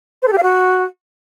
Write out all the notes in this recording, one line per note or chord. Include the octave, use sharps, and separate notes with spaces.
C5
A4
G4
F5
F#4